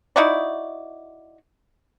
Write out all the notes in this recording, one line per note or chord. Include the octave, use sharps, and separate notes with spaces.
D#4 E4 F#4 D5